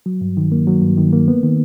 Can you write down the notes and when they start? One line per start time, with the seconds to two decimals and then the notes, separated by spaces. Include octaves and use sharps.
0.06 F#3
0.21 G2
0.37 D#3
0.52 A#3
0.67 F#3
0.82 G2
0.98 D#3
1.13 A#3
1.28 B3
1.43 D#3